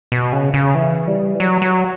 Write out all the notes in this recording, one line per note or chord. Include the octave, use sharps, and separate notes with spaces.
B2
C#3
C#3
E3
G3
E3
F#3
F#3